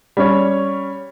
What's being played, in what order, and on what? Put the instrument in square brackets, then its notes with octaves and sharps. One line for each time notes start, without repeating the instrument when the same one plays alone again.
[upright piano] G3 C#4 C#5